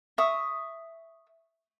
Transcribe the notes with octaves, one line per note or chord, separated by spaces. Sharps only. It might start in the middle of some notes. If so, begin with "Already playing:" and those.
E5 C#6 D#6